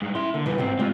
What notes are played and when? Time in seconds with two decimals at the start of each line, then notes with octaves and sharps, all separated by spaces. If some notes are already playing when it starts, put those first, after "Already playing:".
0.02 G2 G#3
0.15 E4 E5 C6
0.34 D3 A#3
0.46 B2 E3 G3
0.58 C#2 G#2 C4 G5
0.79 G3 G#3 C4 F4